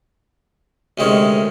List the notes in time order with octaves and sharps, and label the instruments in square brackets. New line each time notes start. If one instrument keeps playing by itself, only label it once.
[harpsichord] D2 C3 D#3 G#3 C#4